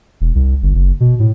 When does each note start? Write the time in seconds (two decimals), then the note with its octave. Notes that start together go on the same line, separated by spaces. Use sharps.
0.21 E1
0.35 C2
0.63 G1
0.74 F#1
1.00 B2
1.19 A2